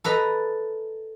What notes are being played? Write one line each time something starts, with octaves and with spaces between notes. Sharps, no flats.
A4 B4 D#5 A#5